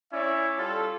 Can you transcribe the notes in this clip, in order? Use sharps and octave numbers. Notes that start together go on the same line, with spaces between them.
C#4 E4 C#5 D5 E5
G3 F4 A4